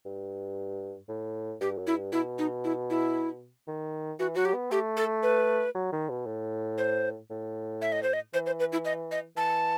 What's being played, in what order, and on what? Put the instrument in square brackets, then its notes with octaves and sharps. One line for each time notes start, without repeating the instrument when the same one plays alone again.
[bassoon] G2
A2
[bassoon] G2 [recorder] G4
[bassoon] F#2
[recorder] E4
[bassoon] G2
[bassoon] B2 [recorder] E4
[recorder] D#4
E4
E4
[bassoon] D#3
[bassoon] E3 [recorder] F#4
[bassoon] F#3 [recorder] F#4
[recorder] G4
[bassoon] B3
[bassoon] A3 [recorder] G4
[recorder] A4
B4
[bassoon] F#3
D#3
B2
A2
[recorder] C5
[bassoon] A2
[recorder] E5
D#5
C5
D#5
[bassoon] E3 [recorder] C5
[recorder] C5
B4
E4
D#5
D#5
[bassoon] E3 [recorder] A5